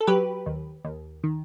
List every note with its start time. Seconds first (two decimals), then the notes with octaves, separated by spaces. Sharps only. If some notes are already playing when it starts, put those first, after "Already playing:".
0.01 A4
0.07 F#3 G4 B4
0.46 D#2
0.85 D#2
1.24 D#3